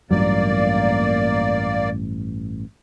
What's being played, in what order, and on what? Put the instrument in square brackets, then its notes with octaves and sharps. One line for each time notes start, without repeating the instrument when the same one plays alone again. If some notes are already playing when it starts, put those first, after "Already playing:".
[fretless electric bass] A1 G2 F#3 [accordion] A#3 D5